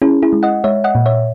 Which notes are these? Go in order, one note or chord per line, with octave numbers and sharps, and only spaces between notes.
C#4 E4 G#4
E4 G#4
G#3
D#5 F#5
G#3 C#5 E5
D#5 F#5
A#2
C#5 E5